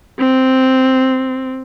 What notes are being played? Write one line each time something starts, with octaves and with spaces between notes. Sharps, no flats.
C4